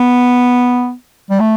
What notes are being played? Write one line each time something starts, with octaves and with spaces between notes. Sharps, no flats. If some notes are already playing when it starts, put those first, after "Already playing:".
Already playing: B3
G3
A3